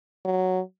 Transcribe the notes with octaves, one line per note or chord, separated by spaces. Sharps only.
F#3